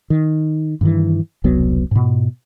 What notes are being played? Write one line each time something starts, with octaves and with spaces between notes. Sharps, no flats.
D#3
G2 D#3 E3
E1 C2 F#3 B3
G#2 B2